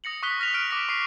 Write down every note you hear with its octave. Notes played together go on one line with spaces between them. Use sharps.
D#6 A#6 C#7 F#7
C#6 D#6 F#6 B6 G7
F6 A#6 B6 F7
F6 F#6 A#6 D7
D6 A#6 B6
C#6 B6 C7